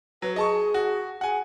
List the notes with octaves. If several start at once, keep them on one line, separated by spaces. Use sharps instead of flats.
F#3 B4
G#4 D#5 A5 C#6
F#4
G#4 F#5 G#5